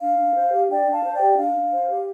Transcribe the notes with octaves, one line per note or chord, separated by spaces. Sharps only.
D4 F5
D4
C5
G4
D4 D5 G5
D4
F5 A5
C5
D5 G5
G4
D4 F5
D4
C5
G4